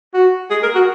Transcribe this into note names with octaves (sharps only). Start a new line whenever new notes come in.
F#4
G#4
A#4
F#4